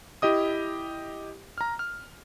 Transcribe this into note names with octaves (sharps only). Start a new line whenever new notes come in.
E4 G4 D#5 D#6
A#5 F6
F6